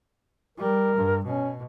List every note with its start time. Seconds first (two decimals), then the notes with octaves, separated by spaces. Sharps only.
0.58 G3 A#4
0.96 G2
1.25 B2 C#4